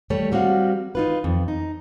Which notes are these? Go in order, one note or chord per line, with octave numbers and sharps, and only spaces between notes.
G3 A3 C#5
F#3 G3 C4 F#4 F5
D#4 F4 B4
F2
D#4